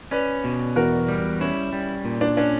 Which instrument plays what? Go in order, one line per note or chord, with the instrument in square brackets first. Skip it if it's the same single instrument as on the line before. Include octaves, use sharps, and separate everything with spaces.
[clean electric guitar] C#4 [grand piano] B4 D5
[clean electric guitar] B2
[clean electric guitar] E2 [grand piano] F#4 A#4
[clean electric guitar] G3
[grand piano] C#4 [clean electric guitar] E4
[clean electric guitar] G3
A#2
[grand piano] D4
[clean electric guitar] C#4 [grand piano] D4